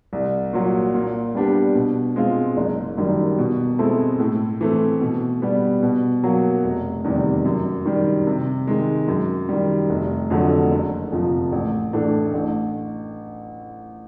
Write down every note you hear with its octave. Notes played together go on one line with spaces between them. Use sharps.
C2
A#2 F#3
A#2
G3 B3 D4 G4
B2
G#3 C4 F4
F#1
F#2 D#3 G3
B2
G#3 C4 E4 A4
A2
E3 A3 C4
B2
G3 B3
B2
F#3 A#3
F1
E2 C3 D#3 G3
F#2
D#3 G3
C3
D#3 G#3
F#2
D#3 G3
F1
F2 D3 F#3 A3
F#1
F2 C3 F3
A1
A2 E3 A3 D4
A1